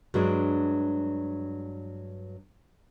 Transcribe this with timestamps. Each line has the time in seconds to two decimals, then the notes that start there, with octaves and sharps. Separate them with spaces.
0.14 G2 F#3 G#3 D4